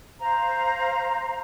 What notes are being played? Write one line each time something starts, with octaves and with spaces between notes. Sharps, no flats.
C5 F5 A#5